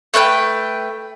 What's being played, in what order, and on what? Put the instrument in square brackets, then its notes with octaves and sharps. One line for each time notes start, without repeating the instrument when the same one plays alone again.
[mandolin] A3 B4 F5 G5